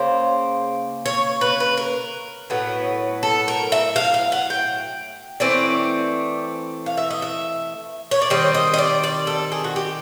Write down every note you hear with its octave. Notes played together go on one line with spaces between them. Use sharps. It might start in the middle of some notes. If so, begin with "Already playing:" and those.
Already playing: C#3 A#3 C5
C#5
B4
B4
A#4
A2 F#3 B3
A4
A#4
E5
F5
F5
F#5
G5
E3 A3 C4 D5
F5
E5
D#5
E5
C#5
D5
D#3 G3 C4 D#5
D#5
D#5
D5
D5
A4
G#4
F#4
G4